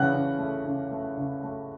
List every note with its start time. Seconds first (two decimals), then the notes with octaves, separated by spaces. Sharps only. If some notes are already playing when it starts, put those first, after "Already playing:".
Already playing: C#3 E3 F#5 F#6
0.13 C#3
0.38 A3
0.65 C#3
0.91 A3
1.17 C#3
1.43 A3